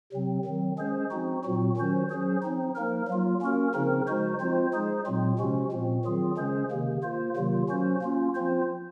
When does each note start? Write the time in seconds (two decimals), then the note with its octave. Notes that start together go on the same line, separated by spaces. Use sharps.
0.12 C3 F#3 C4
0.45 D#3 F#3 C4
0.78 G#3 C#4 G#4 C5
1.11 F3 C4 D#4 F#4
1.43 A#2 F#3 C4 F#4
1.77 D#3 F#3 C#4 F#4 C5
2.09 F#3 C#4 G#4 C5
2.42 F3 C4 D#4
2.75 F3 A#3 D#4 A#4
3.08 F#3 A#3 F4
3.41 A#3 C#4 F#4 A#4
3.74 C#3 F3 C4 D#4 A#4
4.07 F3 G#3 D#4 F#4 C5
4.40 F3 C4 F4 C5
4.73 G#3 D#4 G#4 C5
5.06 A#2 F#3 C4 F4
5.38 C3 F3 G#3 C#4 F#4
5.72 A#2 F3 C4
6.05 D#3 F#3 C4 F4 G#4
6.37 C#3 G#3 C#4 G#4 C5
6.70 C3 D#3 A#3
7.03 A#3 F4 C5
7.36 C3 D#3 F#3 A#3 F4
7.69 F#3 C#4 F#4 C5
8.01 A#3 C#4 F4
8.34 F3 C4 F4 C5